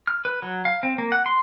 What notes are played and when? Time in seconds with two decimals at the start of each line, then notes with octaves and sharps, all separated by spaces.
0.07 F6
0.25 B4
0.42 F#3
0.65 F5
0.83 C4
0.98 A#3
1.12 F#5
1.26 C6